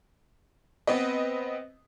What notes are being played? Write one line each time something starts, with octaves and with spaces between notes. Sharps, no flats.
B3 C4 B4 D#5